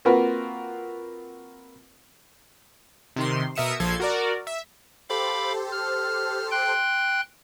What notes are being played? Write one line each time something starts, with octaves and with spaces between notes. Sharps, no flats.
A#3 C4 F4 F#4 A#4 B4
C3 D#3 C6
B2 A#4 E5 D#6 C#7 E7
A#1 F3 A4 C6 G#6
F#4 A#4 D5
E5
G4 A4 C5 F5 B5 D6
F6
G5 C6 F#6